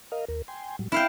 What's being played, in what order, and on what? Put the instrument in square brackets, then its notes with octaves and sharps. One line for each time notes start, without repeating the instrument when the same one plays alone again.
[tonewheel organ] A#4 D#5 F5
D#2 A#4
G5 G#5 C6
A2 F#3 G3
[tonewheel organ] C4 [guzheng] E4 F5 G5